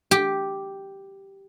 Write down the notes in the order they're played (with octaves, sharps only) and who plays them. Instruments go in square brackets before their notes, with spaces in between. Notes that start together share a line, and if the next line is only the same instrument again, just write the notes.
[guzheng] G4